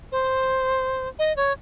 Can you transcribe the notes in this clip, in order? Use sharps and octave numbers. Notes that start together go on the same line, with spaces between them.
C5
D#5
C#5